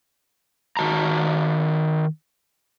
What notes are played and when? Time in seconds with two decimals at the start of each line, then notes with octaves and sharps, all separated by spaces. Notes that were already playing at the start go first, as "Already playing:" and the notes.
0.77 D#3 F#4 A5 A#5